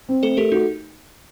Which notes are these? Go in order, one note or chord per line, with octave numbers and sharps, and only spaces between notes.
C4
A3 A4 C5
A3 G4 A#4
D#4 F#4